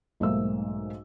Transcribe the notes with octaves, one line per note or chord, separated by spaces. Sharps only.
B1 G#2 A3 A#3 C5 E6